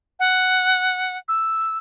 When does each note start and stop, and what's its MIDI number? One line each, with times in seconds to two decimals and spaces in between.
0.20 1.17 78
1.28 1.78 88